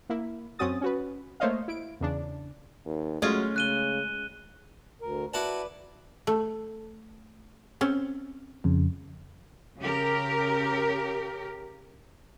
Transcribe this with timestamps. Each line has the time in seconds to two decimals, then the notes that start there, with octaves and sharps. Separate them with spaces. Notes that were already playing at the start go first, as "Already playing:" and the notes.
0.09 A#3 E4
0.59 F#2 C4 C#4 F#4 D#6 A6
0.81 C#4 F#4 B4
1.40 A3 A#3 C5 C#5 D#5 F5
1.68 E4 D7
2.01 E2 C#3 D4
2.86 D#2
3.22 F#3 G#3 A3 C#4 F4
3.56 C#3 F#6 D#7 G7
5.01 D2 A#4
5.34 E4 F#4 B4 D5 A5
6.27 A3
7.81 C4 C#4
8.64 F2 C#3
9.79 C#3 G4 A#4